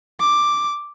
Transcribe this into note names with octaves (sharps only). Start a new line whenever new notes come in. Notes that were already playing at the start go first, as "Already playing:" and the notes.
D6